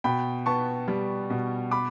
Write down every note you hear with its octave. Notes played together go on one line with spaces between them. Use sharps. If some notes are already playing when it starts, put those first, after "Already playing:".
B2 G5 B5
B3 A5 C#6
G3
B2
B5 D6